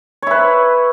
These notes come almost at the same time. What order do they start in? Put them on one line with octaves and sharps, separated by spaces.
C#5 E4 B4